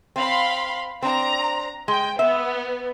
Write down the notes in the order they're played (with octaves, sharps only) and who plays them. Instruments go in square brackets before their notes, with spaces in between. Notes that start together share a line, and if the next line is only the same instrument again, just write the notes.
[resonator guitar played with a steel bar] C4 [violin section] F5 B5 C6
[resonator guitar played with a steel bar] C4 D4 [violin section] A#5
[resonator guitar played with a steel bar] G#3 [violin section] G5
[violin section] B3 [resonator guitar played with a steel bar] E5